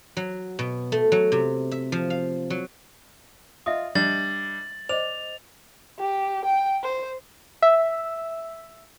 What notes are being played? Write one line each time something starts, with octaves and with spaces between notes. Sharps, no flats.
F#3
B2
A3
F#3
C3
E5
F3
F5
F#3
F4 D#5 E5 D#6
G3 D4 A6 F#7
C5 D5 D#5 F7
G4
G5
C5
E5